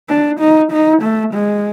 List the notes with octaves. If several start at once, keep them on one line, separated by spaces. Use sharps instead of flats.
D4
D#4
D#4
A3
G#3